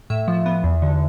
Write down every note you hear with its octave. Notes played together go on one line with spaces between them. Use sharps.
A2 E5
F3
B3
E2
D3